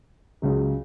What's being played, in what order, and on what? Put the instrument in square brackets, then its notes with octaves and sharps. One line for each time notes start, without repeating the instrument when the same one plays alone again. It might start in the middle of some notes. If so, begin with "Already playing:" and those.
[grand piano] C#2 C#3 F#3